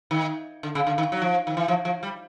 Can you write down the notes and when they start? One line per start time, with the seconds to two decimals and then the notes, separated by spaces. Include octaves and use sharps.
0.11 D#3
0.63 D3
0.75 C#3
0.87 D3
0.98 D#3
1.12 F#3
1.22 F3
1.47 D#3
1.57 E3
1.68 F3
1.85 F3
2.03 G3